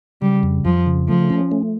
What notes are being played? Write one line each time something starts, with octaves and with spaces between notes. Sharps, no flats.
C#3 G3
F2
F2 F3
C#3
F3 A3
C#4
A3